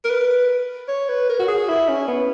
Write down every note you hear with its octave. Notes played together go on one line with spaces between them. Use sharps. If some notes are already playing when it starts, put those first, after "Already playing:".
A#4
B4
C#5
B4
A#4
F#4
G#4
E4
C#4
B3